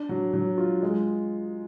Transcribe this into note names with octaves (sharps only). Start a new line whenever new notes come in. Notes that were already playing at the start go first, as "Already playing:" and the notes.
Already playing: D4
F#3
F#3
F4
G#3